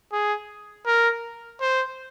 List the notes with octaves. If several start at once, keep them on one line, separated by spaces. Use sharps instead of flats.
G#4
A#4
C5